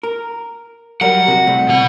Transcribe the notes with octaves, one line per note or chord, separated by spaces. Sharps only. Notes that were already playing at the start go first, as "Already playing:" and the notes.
A#4
F#3 G3 A#4 F#5
C3 F#4
C2 A3 C4
B2 F#5